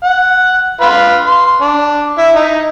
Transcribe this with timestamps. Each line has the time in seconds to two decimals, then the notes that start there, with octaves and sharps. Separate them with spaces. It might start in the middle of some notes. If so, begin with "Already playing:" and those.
0.04 F#5
0.81 F4 B4 B5
1.26 C6
1.61 D4
2.18 E4
2.35 D#4